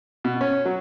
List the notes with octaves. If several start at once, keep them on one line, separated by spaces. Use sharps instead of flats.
B2
C#4
F#3